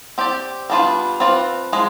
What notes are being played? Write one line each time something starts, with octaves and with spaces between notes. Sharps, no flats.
C4 G4 D5
G3 B3 D4 F4
F3 C4 F4 B4 D5
F3 G#3